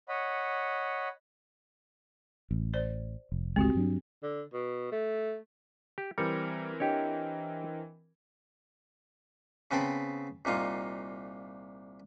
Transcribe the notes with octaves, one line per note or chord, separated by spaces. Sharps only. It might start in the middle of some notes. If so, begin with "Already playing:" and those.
C#5 D#5 F#5 B5
A1
C5 D5
F1
G1 C#2 G#3 C4 F#4 G4
G2 F#3 D4
D3
B2
A3
G4
E3 G3 C4 A#4 C#7
D4 G4 C#5 D#5 G5
C#3 B3 C4 G5 A5 B5
C2 A#2 D#4 F4